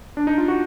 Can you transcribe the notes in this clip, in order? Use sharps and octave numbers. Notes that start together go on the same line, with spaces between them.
D4
D#4
F4
F#4